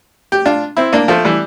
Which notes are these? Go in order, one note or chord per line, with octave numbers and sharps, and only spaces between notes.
G4
D4 F4
C4 E4
A#3 D4
F3 A3
E3 G3